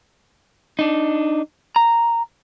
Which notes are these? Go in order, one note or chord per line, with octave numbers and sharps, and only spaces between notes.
D4 D#4
A#5